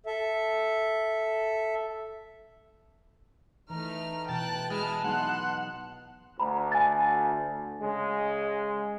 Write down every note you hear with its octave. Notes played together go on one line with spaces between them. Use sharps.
A4 E5
E3 A3 D#4 A#5 F6
B2 E3 G5 A5 F#6
G#3 E4 A5 F6
F#3 B3 D#4 F#5 C6
D2 A#5 B5
G#5 A6
C#3 G#3